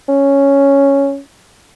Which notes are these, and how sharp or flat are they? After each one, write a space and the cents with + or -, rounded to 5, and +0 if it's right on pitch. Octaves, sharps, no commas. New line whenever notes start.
C#4 +0